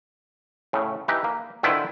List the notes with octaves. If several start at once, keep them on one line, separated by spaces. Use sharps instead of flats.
A2 C#3
E3 D#4 G4 B4
A#3
D3 D#3 E4 F4 B4 C5